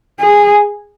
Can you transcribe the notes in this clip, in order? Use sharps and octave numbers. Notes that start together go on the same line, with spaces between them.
G#4